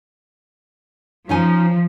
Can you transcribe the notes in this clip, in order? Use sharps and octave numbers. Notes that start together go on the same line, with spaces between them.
F3 C#4 D#4 G#5